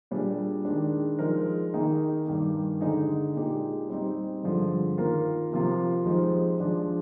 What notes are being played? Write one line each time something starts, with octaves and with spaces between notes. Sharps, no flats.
A#2 G3 D4 G#4
D#3 G#3 D4
F3 G#3 D#4 A#4
D#3 A#3 D#4 G#4
G2 D#3 A#3
D3 G#3 D#4 G#4
A#2 G#3 D#4 G4
G3 C4 D#4
G2 D3 F3 G#3
D#3 A#3 F4 A#4
C3 F3 A#3 F4
F3 G#3 D#4 G4 C5
F3 G#3 D4